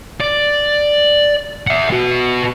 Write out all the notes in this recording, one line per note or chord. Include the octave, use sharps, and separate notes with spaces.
D5
E5 F#5
B3 F#4